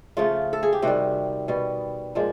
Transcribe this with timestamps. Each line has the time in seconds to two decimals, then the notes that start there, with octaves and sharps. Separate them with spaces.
0.17 C#3 F3 A3 F4
0.53 A4
0.63 G#4
0.73 G4
0.82 C3 D#3 G3 F#4
1.48 B2 G3 B3
2.15 A#2 F3 G#3